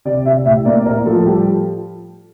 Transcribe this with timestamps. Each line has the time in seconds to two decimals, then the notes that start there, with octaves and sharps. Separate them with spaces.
0.05 C3 D5
0.25 C3 E5
0.46 A2 E5
0.65 A#3 D5
0.86 A2 A#4
1.06 F3 A4
1.17 A4
1.26 G3 G4